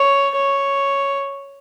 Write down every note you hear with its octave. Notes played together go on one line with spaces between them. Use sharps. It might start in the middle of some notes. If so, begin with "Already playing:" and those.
Already playing: C#5
C#5